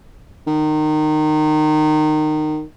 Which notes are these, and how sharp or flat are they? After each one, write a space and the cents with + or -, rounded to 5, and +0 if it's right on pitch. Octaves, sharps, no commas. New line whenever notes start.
D#3 -20